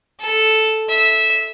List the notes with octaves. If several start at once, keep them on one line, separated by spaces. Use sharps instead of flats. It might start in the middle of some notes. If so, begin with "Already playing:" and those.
A4
E5